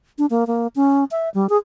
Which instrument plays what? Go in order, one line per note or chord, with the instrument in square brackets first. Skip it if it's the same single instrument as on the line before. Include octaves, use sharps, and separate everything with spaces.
[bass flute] D4
A#3
A#3
C#4
E5
G3
G#4